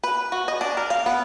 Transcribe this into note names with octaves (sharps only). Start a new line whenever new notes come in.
B4
F#4
D#5
D4
A#4
F5
B3